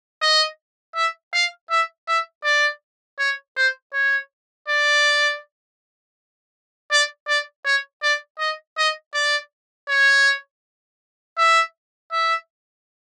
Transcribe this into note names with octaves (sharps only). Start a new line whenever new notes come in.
D#5
E5
F5
E5
E5
D5
C#5
C5
C#5
D5
D5
D5
C#5
D5
D#5
D#5
D5
C#5
E5
E5